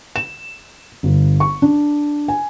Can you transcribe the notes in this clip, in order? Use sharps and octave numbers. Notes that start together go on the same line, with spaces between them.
E7
G1
C#6
D4
G#5